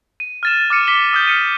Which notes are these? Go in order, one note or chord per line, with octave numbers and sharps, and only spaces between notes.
D#7
F6 A6 E7
D6 F6 C#7 D#7
D6 B6 G7
D#6 F6 G6
F6 C#7 D#7